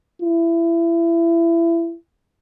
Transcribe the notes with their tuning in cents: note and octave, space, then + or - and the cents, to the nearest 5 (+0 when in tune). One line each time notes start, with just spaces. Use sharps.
E4 +25